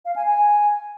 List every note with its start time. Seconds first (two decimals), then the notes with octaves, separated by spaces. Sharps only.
0.05 F5
0.16 G#5
0.26 G#5